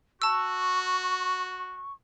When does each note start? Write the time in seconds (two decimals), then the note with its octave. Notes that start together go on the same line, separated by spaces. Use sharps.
0.22 F#4 A5 C#6 E6